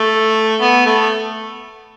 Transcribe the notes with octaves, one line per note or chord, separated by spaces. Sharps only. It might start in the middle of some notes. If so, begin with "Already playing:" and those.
Already playing: A3
B3
A3